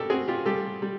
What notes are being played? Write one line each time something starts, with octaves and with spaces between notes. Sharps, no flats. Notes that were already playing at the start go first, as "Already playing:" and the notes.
Already playing: B2 G4 A4 A#4
C4 F#4 G#4
F4 G4
G3 G4 A4
G3